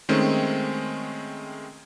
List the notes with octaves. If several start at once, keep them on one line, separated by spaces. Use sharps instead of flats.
D#3 G#3 A3 C4 C#4